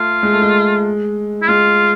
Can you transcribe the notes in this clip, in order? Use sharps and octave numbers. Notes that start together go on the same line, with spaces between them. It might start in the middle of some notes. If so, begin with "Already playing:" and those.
Already playing: A3 F4
G#3
A3
G#3
E4
G#3 F4